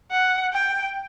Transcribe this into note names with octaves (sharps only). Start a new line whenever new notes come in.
F#5
G5